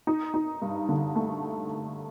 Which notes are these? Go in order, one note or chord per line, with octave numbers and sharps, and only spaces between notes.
D#4
D#4
G2
D3
A3